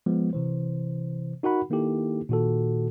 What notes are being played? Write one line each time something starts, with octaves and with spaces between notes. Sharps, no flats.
F3 G#3 B3
C3 E3 C5
D#4 F#4 A#4 F#5 B5
D#3 A#3 D#4 E4 G4 A4
A#2 D#3 F#4 A4